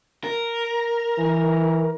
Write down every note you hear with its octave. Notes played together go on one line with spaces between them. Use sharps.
A#4
E3